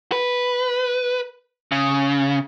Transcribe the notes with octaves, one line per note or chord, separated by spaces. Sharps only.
B4
C#3